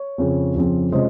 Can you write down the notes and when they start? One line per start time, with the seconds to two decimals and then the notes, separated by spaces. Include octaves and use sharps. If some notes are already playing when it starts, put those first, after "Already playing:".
Already playing: C#5
0.18 F2 C#3 F3 C4
0.55 F2 C#3 F3 C4
0.92 C3 F3 G#3 C#4 C5 D#5